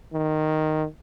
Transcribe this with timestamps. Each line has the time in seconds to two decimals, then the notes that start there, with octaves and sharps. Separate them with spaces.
0.13 D#3